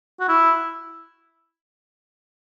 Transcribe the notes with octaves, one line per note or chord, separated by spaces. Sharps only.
F#4
E4